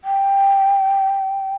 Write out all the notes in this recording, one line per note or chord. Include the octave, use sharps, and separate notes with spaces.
G5